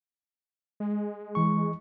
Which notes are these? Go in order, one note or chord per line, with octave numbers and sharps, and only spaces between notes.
G#3
E3 C#6